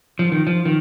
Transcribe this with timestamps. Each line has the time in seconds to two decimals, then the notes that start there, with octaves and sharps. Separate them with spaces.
0.19 F3
0.32 D#3
0.47 F3
0.65 D#3